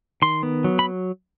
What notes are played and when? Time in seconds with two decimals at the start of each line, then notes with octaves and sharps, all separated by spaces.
0.22 D#3 C6
0.43 B3
0.64 F#3
0.79 B5